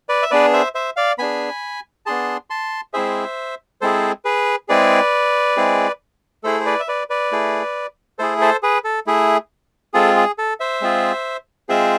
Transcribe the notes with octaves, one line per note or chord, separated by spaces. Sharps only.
B4 D5
E5
B3 D4 G#4 B4 D5
C5 E5
C5 E5
D5 F5
B3 D4 G#4 G#5 B5
B3 D4 G#4 A5 C6
A5 C6
G#3 C4 E4 G#4 C5 E5
G#3 C4 E4 G#4 A4 C5
G#4 B4
G#3 C4 E4 G#4 B4 D5
G#3 C4 E4 G#4
A3 E4 G#4 A4 C5
C5
B4 D5
E5
B4 D5
B4 D5
A3 E4 G#4
A3 E4 G#4 A4 C5
A4 C5
G#4 B4
A4
A3 E4 G#4
G#3 C4 F4 G#4 A4
G#4
A4
C5 E5
G#3 C4 F4 G#4
G#3 C4 F4 G#4 C5 E5